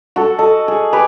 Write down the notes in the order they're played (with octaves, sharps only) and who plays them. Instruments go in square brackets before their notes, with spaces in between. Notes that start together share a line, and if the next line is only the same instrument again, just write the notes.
[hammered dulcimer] F#4 A4
A4 D#5
G#4
G4 B4 G#5